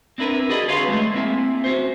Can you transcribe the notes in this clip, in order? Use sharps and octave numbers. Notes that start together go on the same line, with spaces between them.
C4 D4 E4 A#4 B4
F#4 G#4 D5 D#5 B5
D3 G#4 B4 C#5 F5 C6
G#3 A3 E4
A#3 C4 E4 E5 G#5
C#4 F#4 C5